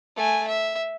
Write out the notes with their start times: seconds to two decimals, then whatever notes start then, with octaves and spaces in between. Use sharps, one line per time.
0.16 A3 G#5
0.48 E5